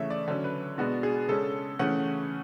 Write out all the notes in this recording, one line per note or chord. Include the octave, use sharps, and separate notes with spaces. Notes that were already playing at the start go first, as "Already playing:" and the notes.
Already playing: C#3 E3 A3 C#5 E5
D5
D3 F#3 C#4
B4
B2 G#3 B3 D4 F#4
G#4
C#3 G#3 C#4 A4
C#3 E3 A3 C#4 F#5